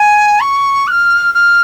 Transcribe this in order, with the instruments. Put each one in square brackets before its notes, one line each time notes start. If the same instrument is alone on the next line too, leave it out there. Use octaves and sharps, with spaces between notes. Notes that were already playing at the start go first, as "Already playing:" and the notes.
Already playing: [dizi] G#5
C#6
F#6
F6
F6